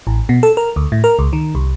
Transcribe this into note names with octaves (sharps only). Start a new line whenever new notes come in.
A1
B2
A4
A#4
D2
A2
A#4
C#2
D#3
C2